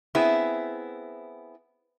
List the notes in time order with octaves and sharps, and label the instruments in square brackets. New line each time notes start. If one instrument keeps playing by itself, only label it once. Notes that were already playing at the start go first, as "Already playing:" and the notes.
[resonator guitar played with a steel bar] B3 C4 E4 G#4